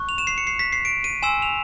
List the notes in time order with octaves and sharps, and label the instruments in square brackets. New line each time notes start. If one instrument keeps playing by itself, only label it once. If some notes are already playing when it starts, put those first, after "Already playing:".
Already playing: [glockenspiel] C#6 F#6
F7
E7
C7
C#7
C7
B6
C7
D7
D#7
G#5 C6 E6 E7
F7